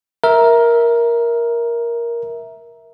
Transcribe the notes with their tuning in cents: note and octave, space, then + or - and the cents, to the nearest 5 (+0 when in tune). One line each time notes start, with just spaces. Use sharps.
A#4 +10 E5 -10